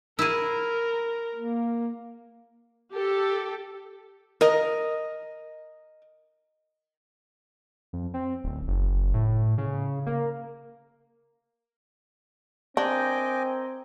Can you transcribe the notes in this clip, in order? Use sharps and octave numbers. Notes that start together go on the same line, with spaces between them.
E4 G#4 A#4
A#3
G4 A4
A#4 D#5
F2
C4
D1
F#1
A2
C#3
A#3
C4 D4 A#4 D#5 G5 G#5 D6